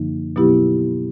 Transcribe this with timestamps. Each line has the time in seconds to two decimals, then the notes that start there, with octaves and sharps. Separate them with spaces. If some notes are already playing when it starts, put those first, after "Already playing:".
Already playing: F#2 D3 F3 A#3 D#4
0.36 B2 F#3 B3 E4 G4